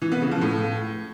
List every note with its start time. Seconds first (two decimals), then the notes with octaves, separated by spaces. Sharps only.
0.02 E3
0.12 B3
0.22 C#3
0.31 F3
0.41 A2